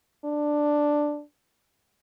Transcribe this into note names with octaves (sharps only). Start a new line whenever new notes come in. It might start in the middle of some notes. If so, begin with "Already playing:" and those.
D4